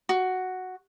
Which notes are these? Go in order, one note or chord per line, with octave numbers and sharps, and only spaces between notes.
F#4